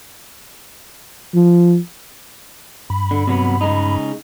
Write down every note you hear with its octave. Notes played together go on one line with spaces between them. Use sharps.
F3
G2 B5
D3
C3 F#3 B3
C#3 G#3 D#4